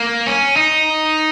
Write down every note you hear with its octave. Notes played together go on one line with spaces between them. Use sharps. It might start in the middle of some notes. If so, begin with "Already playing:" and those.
Already playing: A#3
C#4
D#4